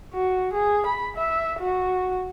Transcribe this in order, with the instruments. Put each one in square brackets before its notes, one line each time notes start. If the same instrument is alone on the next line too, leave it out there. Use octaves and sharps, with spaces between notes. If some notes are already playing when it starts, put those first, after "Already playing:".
[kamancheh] F#4
G#4
B5
E5
F#4